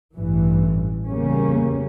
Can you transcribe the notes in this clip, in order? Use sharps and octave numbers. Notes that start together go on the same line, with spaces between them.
A1 G2 E3
E2 C#3 G3 A#3 C#4